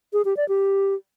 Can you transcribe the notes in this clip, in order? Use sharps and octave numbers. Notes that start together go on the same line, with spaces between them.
G#4
G4
D5
G4